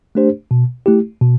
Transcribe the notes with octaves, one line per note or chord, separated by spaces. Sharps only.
A3 D4 G4 C5
B2
A3 E4 G4
B2